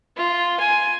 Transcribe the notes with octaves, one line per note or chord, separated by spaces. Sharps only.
F4
G#5